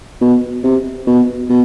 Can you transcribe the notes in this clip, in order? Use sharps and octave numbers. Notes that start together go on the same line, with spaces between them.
B2
C3
B2
B2